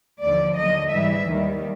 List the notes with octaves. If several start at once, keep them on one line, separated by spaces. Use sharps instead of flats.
D#2 D3 F3 D5
D#2 D3 F#3 D#5
G#2 E3 G3 E5
D#2 D#3 G3